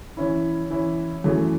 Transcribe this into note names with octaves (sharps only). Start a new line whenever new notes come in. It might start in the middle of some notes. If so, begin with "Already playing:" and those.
E3 C#4 E4
E3 C#4 E4
F#2 E3 A3 C#4